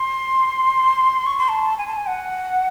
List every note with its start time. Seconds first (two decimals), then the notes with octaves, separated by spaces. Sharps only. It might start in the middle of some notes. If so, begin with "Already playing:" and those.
Already playing: C6
1.26 C#6
1.38 C6
1.48 A5
1.78 G#5
1.87 A5
1.97 G#5
2.07 F#5